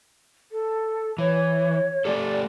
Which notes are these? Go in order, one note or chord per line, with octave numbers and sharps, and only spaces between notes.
A4
E3 C#5
A3 G4 A4 D5